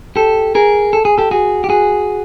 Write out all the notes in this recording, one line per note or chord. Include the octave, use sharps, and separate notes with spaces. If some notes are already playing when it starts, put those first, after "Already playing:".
G4 A4
G#4 A#4
A4
G#4
G4 A4
F#4 G#4
G4
F#4 G#4